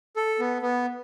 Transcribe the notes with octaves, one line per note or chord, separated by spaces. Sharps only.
A4
B3
B3